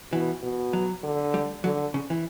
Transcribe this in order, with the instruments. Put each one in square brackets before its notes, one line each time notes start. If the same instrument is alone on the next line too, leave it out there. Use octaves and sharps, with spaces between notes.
[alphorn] B2 [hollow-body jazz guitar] E3
[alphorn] B2
[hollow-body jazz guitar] F#3
[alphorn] D3
[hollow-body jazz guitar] G3
[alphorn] D3 [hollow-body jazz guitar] F#3
[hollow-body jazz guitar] C#3
E3